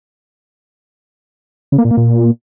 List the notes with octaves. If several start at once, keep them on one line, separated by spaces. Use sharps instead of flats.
C#3
A#3
A#2
A#3
A#2